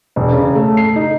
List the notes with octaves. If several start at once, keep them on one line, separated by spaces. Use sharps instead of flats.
E1
C#3
A3
C7
D#4